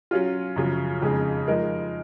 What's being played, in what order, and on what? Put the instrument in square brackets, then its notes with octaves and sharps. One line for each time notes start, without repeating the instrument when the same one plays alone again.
[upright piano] F#3 C#4 F4
F#2 C#3 F3
F2 C#3 G#3 D#4 G#4
F3 G#3 D#4 A#4